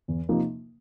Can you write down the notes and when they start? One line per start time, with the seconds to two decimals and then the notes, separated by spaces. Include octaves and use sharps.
0.08 E2
0.29 C3 F3 A#3 D#4